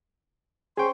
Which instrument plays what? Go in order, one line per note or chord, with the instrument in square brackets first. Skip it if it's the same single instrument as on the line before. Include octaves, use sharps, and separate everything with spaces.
[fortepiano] C#4 G5 [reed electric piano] G#4 [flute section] C5 C6 C#6